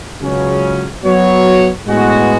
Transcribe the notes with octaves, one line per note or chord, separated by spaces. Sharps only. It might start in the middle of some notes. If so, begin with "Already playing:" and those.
C#2 C#3 F#3 C#4
F#3 B3 F#4 C#5
A2 G#3 B3 F#4